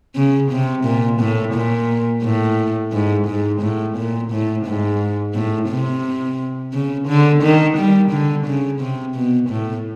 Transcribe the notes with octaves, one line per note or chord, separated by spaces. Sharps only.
C#3
C3
A#2
A2
A#2
A2
G#2
G#2
A2
A#2
A2
G#2
A2
C3
C#3
D3
D#3
G3
D3
C#3
C3
B2
A2